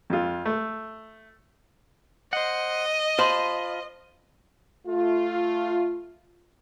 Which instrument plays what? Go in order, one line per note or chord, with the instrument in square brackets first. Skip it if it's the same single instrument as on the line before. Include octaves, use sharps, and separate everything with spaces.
[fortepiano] F2 F4
A3
[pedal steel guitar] C5 F#5 [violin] D#5
[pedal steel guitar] F4 A5 B5 [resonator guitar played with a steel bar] C5
[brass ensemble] A3 F4